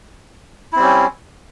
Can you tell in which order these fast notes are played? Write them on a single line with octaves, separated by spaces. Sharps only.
E4 C4 G3 C#4